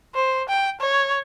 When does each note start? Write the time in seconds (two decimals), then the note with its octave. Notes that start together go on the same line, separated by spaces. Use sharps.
0.15 C5
0.49 G5
0.80 C#5